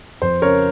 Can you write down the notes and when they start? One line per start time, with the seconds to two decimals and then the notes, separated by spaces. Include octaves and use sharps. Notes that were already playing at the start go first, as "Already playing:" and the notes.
0.21 F2 C5
0.42 C#3 A#4 C#5